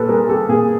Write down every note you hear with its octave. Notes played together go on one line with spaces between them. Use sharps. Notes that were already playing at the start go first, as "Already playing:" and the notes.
Already playing: A#2 G4 A4 B4
G3 G#4 A#4
G4 A4
A#2 G#4